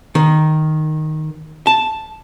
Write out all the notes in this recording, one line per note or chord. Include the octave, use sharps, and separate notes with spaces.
D#3
A5